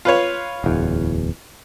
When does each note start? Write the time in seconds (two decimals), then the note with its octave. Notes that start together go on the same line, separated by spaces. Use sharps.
0.05 F4 B4 C#5
0.64 D1 E2